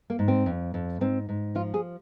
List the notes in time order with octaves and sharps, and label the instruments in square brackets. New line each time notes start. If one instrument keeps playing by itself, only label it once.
[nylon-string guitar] A#3
G#2
C4
F2
F2
G#2 C4
G#2
F3 F4
G#4